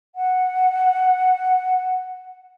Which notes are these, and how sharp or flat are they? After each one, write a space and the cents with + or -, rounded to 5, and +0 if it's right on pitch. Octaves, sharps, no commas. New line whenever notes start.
F#5 -5